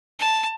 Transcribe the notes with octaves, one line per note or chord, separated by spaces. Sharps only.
A5